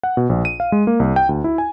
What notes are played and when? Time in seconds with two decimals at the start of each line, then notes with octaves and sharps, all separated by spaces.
0.03 F#5
0.17 B2
0.29 A#1
0.45 D#7
0.60 F5
0.72 G#3
0.87 A#3
1.00 C2
1.16 G5
1.29 D2
1.44 E4
1.58 G#5